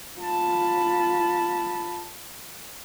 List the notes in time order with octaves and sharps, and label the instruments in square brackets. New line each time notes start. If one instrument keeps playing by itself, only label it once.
[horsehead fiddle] F4 B5 [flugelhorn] A5